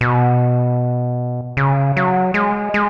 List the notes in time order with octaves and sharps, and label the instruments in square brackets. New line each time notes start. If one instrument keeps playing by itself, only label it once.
[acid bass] B2
C#3
F#3
G#3
G#3